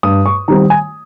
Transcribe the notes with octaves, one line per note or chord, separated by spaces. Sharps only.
G2 D#6
C#6
D#3 G3 C4 A#5
G#5